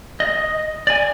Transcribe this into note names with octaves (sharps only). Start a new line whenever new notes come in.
D#5
D5 G#5